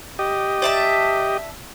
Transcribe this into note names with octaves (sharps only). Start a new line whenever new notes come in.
G4 D#5
D5 E5 A5